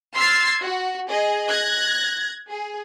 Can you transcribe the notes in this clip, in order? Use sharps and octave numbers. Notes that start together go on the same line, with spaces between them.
C6 E6 F6 G#6 A6 C7
F#4
G#4 D#5
F#6 G#6 A#6
G#4